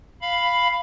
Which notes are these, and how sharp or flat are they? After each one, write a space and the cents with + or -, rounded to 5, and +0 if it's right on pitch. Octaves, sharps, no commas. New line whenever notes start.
F5 +0 B5 +5